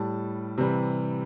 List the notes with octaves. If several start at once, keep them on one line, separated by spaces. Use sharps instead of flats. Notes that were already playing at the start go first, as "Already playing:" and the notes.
Already playing: A2 G3 A5
C3 E3 G3